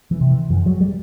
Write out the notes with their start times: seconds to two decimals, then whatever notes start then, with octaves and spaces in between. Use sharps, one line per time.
0.11 E3
0.21 C3
0.31 E3
0.50 F#2 E3
0.66 F#3
0.81 G3